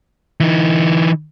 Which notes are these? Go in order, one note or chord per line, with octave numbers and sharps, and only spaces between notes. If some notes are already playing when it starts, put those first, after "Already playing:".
E3 D#4